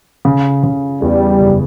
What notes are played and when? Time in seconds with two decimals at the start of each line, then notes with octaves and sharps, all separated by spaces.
0.25 C#3
0.63 C#3
1.02 E2 G3
1.40 F#1